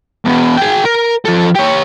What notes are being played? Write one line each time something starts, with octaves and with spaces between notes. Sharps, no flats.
E2 B2
G#4 G5
A#4
F3 A4
G4 C#5